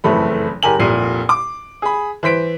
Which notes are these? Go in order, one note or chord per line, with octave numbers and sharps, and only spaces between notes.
F#1 F2 E3 A3 B5
F#1 G4 A#4 G#5 F#7
F1 C2 A#2 C7 D#7
D6
G#4 B5
E3 C5 B6 D7